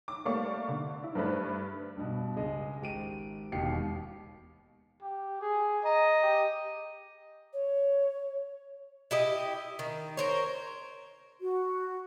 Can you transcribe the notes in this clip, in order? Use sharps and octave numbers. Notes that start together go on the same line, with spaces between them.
D6
G3 A3 A#3 D5 F5 C#6
D3
E4
G2 A3 D4 B4
G2 B2
C#2 G#3 D#5
G#1 G4 D7 D#7
E1 D#2 B2 G4 C7 C#7
G4
G#4
D#5 A#5
G4
C#5
E4 G4 D#5
D#3
A#4 C5 C#5
F#4